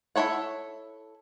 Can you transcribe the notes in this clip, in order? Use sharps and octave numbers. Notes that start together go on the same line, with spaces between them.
E4 F#4 A4 C#5 F#5